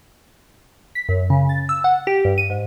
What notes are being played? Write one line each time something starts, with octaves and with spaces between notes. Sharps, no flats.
B6
F#2
C#3
A6
E6
F#5
G4
G2
D#7
G#2